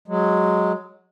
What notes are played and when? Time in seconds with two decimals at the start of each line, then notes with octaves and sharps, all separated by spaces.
0.08 F#3 G#3